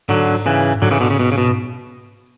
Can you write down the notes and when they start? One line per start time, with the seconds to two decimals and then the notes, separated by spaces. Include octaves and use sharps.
0.09 G#2 D3 F#3
0.46 C#3 E3
0.82 G#2 D3 F#3
0.91 C#3 E3
1.00 B2 D3
1.10 C#3
1.19 B2
1.32 C#3
1.38 B2